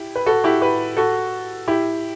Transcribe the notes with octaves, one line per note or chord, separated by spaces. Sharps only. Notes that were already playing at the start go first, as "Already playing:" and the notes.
Already playing: E4 G4
B4
F#4 A4
E4 G4
G4 B4
F#4 A4
E4 G4